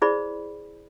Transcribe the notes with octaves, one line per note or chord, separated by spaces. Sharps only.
E4 G#4 C5 D5 B5